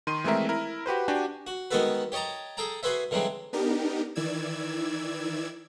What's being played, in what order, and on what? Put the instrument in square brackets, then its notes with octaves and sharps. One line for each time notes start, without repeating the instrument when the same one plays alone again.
[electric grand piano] D#3 C6 D#7
E3 G#3 A3 C4 A#4 E5
E4 A#4
F#4 G4 B4 C5
D4 F#4 G4 G#5
[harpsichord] F#4
D#3 G#3 B3 F#4 A4 B4
G4 C#5 D#5 A5 A#5
G#4 A4 G5 A5 A#5
F#4 G#4 B4 C5 E5
D3 E3 F#3 G#3 C4
[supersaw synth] B3 D4 D#4 G4 A#4
D#3 E3 D5 E6 G#6